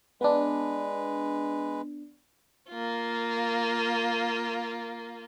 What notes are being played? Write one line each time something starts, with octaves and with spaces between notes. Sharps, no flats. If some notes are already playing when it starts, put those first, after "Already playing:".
G#3 B3 D4 B4
A#3 F4